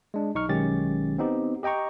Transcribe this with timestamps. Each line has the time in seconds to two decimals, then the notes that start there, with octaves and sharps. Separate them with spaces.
0.14 G#3 D4
0.35 B1 D#4 C#6 F6
0.48 B1 D#3 G#3 C#4 G4 A6
1.18 B3 C4 D#4 G4
1.63 G4 D#5 G5 A#5 C#6